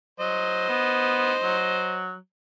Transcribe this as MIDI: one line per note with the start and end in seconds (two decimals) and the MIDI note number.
0.20 0.66 54
0.20 2.01 72
0.20 2.01 75
0.69 1.33 59
1.43 2.16 54